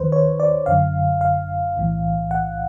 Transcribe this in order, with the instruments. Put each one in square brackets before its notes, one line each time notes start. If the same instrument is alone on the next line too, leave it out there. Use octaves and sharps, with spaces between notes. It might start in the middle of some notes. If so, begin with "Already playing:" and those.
Already playing: [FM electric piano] D#2 D#3 B4 C5
C#5
D5
G1 F#2 D3 F5
F5
B1 A2 E3
F#5